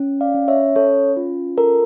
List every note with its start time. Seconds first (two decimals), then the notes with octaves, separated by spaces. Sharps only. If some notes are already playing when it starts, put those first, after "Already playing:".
Already playing: C#4
0.21 D5 F5
0.35 C#4
0.48 C#5 E5
0.76 C#4 A4 C#5
1.17 F4
1.57 A4 A#4